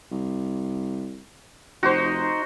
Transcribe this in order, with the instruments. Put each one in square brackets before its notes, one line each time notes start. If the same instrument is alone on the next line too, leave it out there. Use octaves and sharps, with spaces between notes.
[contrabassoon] C2
[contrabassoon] F1 [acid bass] D#4 [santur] F#4 C5